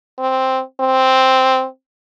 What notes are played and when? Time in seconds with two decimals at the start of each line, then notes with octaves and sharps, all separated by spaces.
0.19 C4
0.80 C4